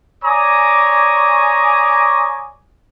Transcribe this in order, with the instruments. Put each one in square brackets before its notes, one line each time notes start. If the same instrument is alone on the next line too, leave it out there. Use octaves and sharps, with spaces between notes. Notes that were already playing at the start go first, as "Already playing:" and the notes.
[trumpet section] C#5 D5 G#5 A#5 D6 D#6